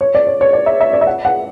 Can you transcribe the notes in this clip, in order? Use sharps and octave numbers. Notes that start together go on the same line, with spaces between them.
C#5
D5
C#5
C#5
D5
E5
E5
D5
E5
F#5
F#5